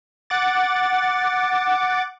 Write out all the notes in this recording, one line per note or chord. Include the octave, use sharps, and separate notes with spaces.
F#5 D6 A6